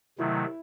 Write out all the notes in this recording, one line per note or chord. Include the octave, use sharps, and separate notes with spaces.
C3 D#3 F#3 A3 E4